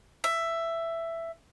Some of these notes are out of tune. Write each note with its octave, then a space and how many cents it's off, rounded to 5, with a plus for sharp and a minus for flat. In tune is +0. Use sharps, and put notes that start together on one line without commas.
E5 +10